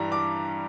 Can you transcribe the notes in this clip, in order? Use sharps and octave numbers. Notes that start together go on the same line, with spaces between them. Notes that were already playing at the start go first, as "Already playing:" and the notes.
Already playing: G2 E3 G3 A#5
D6